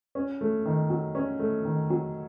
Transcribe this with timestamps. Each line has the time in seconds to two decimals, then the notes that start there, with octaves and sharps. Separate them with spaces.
0.15 C#4
0.41 A3
0.66 D#3
0.90 F#3
1.15 C#4
1.40 A3
1.65 D#3
1.90 F#3